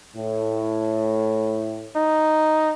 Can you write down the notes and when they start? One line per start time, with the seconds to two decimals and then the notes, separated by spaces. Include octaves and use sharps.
0.15 A2
1.96 D#4